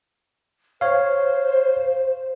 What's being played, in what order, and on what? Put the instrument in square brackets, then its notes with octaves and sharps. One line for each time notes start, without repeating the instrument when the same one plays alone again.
[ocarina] C5 [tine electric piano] C#5 F5